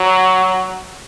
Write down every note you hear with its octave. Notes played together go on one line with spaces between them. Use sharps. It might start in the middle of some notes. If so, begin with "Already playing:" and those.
Already playing: F#3